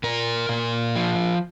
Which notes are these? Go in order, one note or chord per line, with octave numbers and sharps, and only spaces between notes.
A#2 A#4
A#2
F3